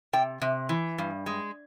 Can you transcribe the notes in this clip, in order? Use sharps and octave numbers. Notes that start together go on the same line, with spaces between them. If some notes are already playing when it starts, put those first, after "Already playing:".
C3 G5
C3
E3
G2
G#3